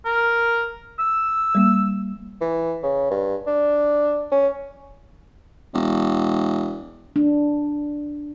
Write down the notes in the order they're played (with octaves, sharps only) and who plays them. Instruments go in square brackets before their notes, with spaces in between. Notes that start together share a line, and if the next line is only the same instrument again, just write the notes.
[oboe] A#4
E6
[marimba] G3 A#3
[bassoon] E3
C#3
G2
D4
C#4
[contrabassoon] E1
[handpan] D4